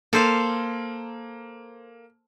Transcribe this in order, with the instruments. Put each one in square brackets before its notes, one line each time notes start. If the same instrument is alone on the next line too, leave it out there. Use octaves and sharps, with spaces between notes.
[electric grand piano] A#3 [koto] A4 C5 F5